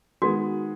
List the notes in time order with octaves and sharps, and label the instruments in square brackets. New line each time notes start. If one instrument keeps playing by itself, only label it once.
[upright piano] D#3 G#3 B3 G#4 [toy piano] F#4